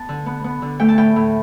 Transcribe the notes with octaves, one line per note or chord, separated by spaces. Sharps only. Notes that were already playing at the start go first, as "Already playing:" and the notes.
Already playing: B3 A5
D3
B3
B3
D3
A3 G5
A5
A2 G5
A2